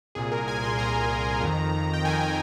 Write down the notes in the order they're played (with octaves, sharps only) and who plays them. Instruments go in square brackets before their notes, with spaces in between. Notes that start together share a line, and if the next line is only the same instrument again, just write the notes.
[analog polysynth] C2 A#2 G#4
A#4
G#5
C6
C2 A#2 A#5
F2 D#3
G5
F2 D#3 G#5
G#5